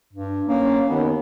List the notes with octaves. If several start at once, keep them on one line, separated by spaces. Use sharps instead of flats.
G2
A#3 C#4
D#2 B3